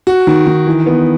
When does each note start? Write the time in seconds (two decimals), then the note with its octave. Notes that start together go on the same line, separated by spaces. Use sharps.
0.07 F#4
0.27 D#3
0.46 D#3
0.67 E3
0.87 B3